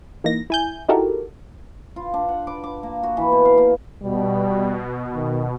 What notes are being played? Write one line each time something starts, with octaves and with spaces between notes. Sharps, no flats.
E3 A#3 D#4 A#6
E4 G#5 G6
D#4 E4 F#4 G4 A4 A#4
F4
D4
F#5
D6
D6
A#3
F#4
E3
B2
F5
A#3
B2 G3
D#3